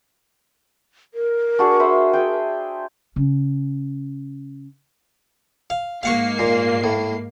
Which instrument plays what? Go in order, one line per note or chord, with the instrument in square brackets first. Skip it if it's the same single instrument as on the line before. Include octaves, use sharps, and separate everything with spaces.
[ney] A#4
[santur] D4 F#4 G#4
C5 E5 B5
G#4 G5
[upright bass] C#3 C#4
[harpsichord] F5
[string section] G#2 A#3 C7 [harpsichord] F5 F#5 C#6
[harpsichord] A#2
A2